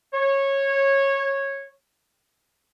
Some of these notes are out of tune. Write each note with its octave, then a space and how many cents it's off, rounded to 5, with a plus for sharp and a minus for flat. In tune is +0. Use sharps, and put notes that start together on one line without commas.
C#5 -15